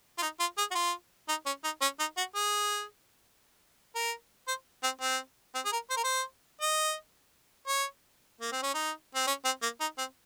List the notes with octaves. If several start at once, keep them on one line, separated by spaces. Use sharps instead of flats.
F4
D#4
F4
G#4
F#4
F4
D#4
C#4
D#4
C#4
D#4
F#4
G#4
A#4
C5
C4
C4
C4
G#4
A#4
C5
A#4
C5
D#5
C#5
A#3
C4
C#4
D#4
C4
C#4
C4
A#3
D#4
C4